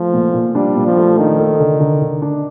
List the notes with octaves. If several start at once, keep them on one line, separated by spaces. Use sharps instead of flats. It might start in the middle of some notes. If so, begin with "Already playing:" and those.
Already playing: F3 A3
A#2
A#2
G3 D4
A#2
F3
A3
D#3 D4
A4
D3
D3
D3
D4